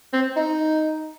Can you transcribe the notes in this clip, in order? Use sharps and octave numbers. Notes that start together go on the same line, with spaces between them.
C4
D#4